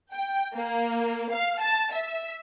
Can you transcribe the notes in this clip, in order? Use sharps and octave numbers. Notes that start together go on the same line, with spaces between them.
G5
A#3
F5
A5
E5